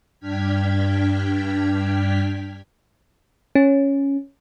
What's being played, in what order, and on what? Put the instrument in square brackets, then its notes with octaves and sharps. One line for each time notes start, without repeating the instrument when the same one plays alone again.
[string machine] G2 D4 G5 F6 G#6 B6
[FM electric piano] C#4